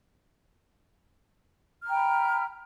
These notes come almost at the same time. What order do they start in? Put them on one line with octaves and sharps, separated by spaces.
F6 A#5 G5 B5